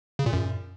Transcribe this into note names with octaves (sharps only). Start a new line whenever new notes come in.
C#3
A#2
F#2